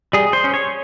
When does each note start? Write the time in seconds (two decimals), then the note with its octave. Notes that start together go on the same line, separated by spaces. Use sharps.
0.13 G3 G#4
0.33 C5
0.44 C#4
0.54 C#5